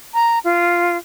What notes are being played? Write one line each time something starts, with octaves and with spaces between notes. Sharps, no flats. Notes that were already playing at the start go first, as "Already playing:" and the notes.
A#5
F4